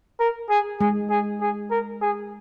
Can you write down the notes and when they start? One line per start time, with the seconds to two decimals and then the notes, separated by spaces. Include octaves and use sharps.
0.19 A#4
0.50 G#4
0.80 G#3 G#4
1.10 G#4
1.41 G#4
1.71 A#4
2.01 G#4